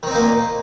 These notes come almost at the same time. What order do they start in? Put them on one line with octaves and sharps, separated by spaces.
D#3 C4 D#4 A#3 A#2